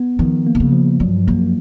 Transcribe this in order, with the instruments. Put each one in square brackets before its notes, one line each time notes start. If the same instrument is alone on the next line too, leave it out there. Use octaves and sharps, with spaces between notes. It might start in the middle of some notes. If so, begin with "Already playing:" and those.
Already playing: [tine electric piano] B3
[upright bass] D#3 [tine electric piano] F3
[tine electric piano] A#3
[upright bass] C3
C#3
[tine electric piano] F3
[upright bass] G2 [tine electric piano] F#3
[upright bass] F#2 [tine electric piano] A#3